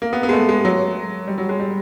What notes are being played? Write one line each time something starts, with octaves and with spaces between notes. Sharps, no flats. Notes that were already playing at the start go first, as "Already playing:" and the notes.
A#3
B3
B3
G#3
A3
G#3
F#3
G3
F#3
G#3
G3